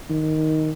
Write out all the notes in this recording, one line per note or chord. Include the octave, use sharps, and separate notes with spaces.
D#3